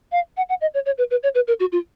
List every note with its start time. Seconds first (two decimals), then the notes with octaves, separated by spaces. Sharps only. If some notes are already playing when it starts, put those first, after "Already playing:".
0.12 F5
0.37 F#5
0.49 F#5
0.61 D#5
0.74 C#5
0.86 C#5
0.98 B4
1.11 B4
1.23 C#5
1.35 B4
1.48 A#4
1.60 F#4
1.72 F4